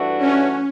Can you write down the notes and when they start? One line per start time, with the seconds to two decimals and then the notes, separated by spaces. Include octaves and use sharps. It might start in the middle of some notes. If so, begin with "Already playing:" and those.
Already playing: G2 E3 A3 D4 F#4
0.17 C#4